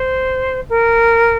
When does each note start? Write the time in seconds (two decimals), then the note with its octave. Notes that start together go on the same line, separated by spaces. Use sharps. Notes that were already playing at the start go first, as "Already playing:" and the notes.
Already playing: C5
0.69 A#4